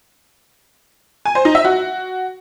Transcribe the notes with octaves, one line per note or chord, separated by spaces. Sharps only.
G#5
C5
D#4
E5
F#4